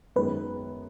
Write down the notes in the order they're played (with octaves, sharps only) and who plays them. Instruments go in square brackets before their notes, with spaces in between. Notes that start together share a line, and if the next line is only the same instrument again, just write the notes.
[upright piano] F#2 D#3 G#3 B3 [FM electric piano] B4